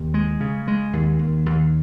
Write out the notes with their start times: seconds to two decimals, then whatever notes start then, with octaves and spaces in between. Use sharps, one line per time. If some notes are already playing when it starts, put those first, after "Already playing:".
Already playing: D#2
0.14 G#3
0.40 C#3
0.68 G#3
0.93 D#2
1.19 D#2
1.46 D#2